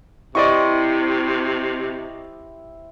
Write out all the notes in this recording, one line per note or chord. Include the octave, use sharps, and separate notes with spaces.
C3 E4 G4 C5 D5 D#5 C#6